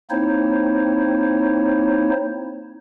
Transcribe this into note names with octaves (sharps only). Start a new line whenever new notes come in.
A#3 C4 D#4 E4 C5 C#5